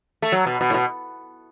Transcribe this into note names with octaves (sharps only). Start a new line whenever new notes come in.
A3
F#3
B2
B2
A2
B2